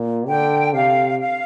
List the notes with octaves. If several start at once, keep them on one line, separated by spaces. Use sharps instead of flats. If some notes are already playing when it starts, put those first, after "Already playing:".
Already playing: A#2
D3 G5
C3 F5
F5